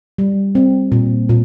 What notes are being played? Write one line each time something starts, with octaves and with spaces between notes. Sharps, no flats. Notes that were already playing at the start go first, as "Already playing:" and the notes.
G3
C4
A#2
A#2